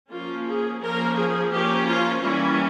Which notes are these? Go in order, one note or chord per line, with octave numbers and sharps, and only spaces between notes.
F3 A#3 C#4 F4
G#4
F3 A#3 C#4 A#4
G#4
F3 A#3 C#4 G4
F4
E3 G3 A#3 C#4 E4